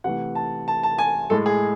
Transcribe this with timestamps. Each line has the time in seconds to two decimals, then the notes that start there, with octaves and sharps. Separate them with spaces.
0.04 C3 E3 A3 F#5
0.35 A5
0.68 A5
0.83 A5
0.98 G#5
1.30 A2 G#3 A4
1.46 G#4